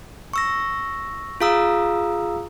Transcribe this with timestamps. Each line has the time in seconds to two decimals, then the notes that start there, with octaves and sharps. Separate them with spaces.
0.33 C#6 E6 A#6
1.41 F4 G#4 F5 A#5 D#6 E6